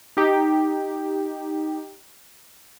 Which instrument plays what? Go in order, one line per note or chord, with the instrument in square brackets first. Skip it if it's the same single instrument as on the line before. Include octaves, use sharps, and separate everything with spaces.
[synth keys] D#4 G4